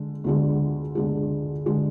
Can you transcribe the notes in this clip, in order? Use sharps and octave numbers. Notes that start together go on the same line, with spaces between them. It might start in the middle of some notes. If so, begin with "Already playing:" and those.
Already playing: D3 G#3
D2 D3 G#3
D2 D3 G#3
D3 G#3